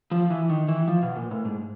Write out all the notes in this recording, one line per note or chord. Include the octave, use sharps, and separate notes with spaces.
F3
E3
D#3
E3
F3
B2
A#2
A2
G#2